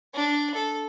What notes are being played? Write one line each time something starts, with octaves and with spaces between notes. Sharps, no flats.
D4
A4